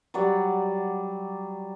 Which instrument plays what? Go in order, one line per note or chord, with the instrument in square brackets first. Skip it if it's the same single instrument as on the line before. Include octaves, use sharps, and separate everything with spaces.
[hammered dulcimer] F#3 G3 D5 F#5